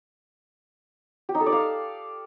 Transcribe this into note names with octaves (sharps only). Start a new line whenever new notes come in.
G4
D#4
A4
D5
F5